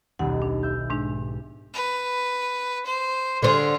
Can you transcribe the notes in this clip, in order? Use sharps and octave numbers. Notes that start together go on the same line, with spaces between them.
D#1 B1 F#5
D4
E5 G6
G#2 G#3 D4
B4
C5
D3 F4 G#4 C5